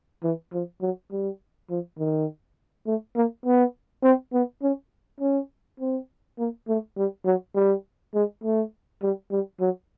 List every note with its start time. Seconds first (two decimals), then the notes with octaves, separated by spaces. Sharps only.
0.23 E3
0.52 F3
0.81 F#3
1.11 G3
1.70 F3
1.99 D#3
2.86 A3
3.16 A#3
3.45 B3
4.03 C4
4.33 B3
4.62 C#4
5.20 C#4
5.80 C4
6.38 A#3
6.68 A3
6.97 G3
7.25 F#3
7.55 G3
8.14 G#3
8.44 A3
9.02 G3
9.31 G3
9.60 F#3